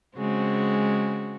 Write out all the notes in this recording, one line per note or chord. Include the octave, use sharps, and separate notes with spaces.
C#3 G#3 C4 F#4